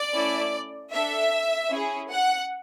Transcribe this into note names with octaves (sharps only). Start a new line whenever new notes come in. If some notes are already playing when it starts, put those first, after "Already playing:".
Already playing: D5
A3 C#4 E4
D4 A4 E5
C#4 E4 G#4
F#5